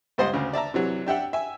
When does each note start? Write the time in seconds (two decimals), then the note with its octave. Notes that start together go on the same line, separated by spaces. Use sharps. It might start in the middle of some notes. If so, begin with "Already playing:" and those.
0.18 C#2 G2 C5 D#5 F#5 C6
0.33 D2 C#3
0.53 D5 E5 A5 A#5
0.74 C3 E3 F#3
1.07 D4 G4 E5 F#5 G5
1.33 E5 G#5